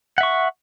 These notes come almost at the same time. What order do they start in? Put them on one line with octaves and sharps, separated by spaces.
F#5 E5 C#6